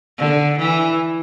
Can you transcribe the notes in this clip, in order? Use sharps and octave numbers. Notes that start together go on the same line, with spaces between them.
D3
E3